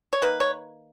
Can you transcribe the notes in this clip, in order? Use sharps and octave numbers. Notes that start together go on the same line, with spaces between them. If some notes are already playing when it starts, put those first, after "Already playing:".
C#5
D#3 A#3 B4
C#5